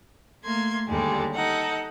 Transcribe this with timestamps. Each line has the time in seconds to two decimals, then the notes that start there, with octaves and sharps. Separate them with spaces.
0.43 A3 A#3 C6 G#6
0.87 D#2 D3 G3 G#3
1.34 D#4 A4 F#5